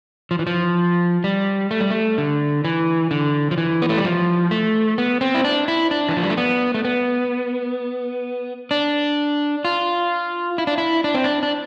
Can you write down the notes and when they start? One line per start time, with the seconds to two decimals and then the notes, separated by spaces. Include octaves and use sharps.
0.31 F3
0.39 E3
0.47 F3
1.24 G3
1.71 A3
1.80 G3
1.90 A3
2.18 D3
2.65 E3
3.11 D3
3.51 F3
3.58 E3
3.82 B3
3.89 A3
3.97 G3
4.05 F3
4.51 A3
4.98 B3
5.21 C4
5.35 E4
5.44 D4
5.68 E4
5.91 D4
6.09 E3
6.17 F3
6.23 G3
6.30 A3
6.37 B3
6.74 A3
6.85 B3
8.71 D4
9.65 F4
10.58 E4
10.67 D4
10.78 E4
11.04 D4
11.15 C4
11.24 D4
11.43 D4